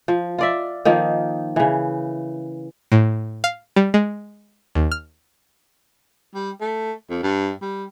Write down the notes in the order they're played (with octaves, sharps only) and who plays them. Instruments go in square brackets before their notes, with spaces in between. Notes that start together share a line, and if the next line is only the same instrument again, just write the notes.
[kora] F3
F4 D5 E5
D#3 F3 A#3 D#4
C#3 E3
[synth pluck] A2
F5
G3
G#3
D#2
F6
[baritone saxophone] G3
A3
F2
G2
G3